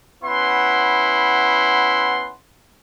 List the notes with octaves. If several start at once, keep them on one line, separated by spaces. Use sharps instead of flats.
B3 C#4 E4 F#5 C6